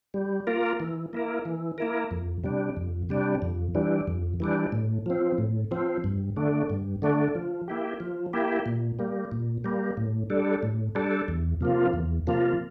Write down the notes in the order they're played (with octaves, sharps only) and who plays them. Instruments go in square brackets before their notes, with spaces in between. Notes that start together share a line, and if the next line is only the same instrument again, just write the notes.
[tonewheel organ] G3
A#3 F4 A#4
E3
A#3 E4 A#4
E3
A#3 E4 A#4
F2
C3 G3 D4
F2
C3 G3 D4
F2
E3 G3 D4
F2
E3 G3 D4
A2
F3 C4
A2
F3 C4
G2
D3 A3 D4
G2
D3 A3 D4
F3
A#3 E4 G4
F3
A#3 E4 G4
A#2
G3 A#3
A#2
G3 A#3
A2
G3 D4 A4
A2
G3 D4 A4
E2
C3 F3 A#3 F4
E2
C3 F3 A#3 F4